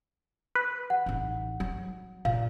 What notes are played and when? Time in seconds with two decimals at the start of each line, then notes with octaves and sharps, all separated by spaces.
0.55 B4
0.90 F#5
1.06 A1 D#4
1.60 F#3
2.25 A#2 F5